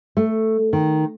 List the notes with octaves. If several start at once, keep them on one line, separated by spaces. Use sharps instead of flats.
A3
D#3